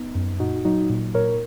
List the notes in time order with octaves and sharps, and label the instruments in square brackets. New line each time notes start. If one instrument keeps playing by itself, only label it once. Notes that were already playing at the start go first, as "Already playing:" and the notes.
Already playing: [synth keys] B3 D#4
F#2
A#2 D#4 F#4
F#3 D#4 F#4
A#2
A#2 A#4 C#5